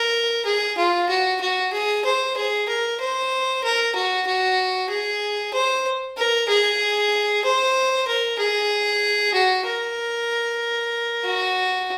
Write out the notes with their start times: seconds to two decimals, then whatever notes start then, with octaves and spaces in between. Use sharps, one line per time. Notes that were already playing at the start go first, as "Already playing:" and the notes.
Already playing: A#4
0.45 G#4
0.77 F4
1.09 F#4
1.41 F#4
1.73 G#4
2.05 C5
2.37 G#4
2.68 A#4
3.00 C5
3.64 A#4
3.95 F#4
4.27 F#4
4.89 G#4
5.53 C5
6.17 A#4
6.48 G#4
7.44 C5
8.07 A#4
8.39 G#4
9.34 F#4
9.66 A#4
11.25 F#4